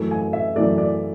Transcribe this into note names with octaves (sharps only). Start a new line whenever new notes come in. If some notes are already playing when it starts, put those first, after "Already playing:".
Already playing: F#2 E3 A3
G#5
E5
F#2 E3 A3 D5
D5